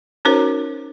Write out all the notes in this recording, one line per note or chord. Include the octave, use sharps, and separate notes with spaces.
C#4 D#4 F#4 A#4 C5 C#5